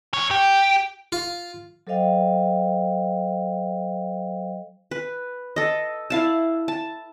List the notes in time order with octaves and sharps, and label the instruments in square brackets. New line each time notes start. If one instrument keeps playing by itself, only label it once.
[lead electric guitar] E2 C#5
G4
[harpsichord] F4
[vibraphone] F#3 A4 C5 D#5 F5 G5
[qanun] B4
A4 D#5
E4 F5 A5
A5